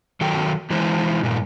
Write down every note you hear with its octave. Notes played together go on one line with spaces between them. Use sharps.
D#3 F#3 A4 G5
E3 G#3 E4 C5
G2 A#2 D4